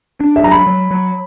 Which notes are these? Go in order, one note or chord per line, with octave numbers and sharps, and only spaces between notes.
D4
E5
F#3 A#5
B5
F#3
F#3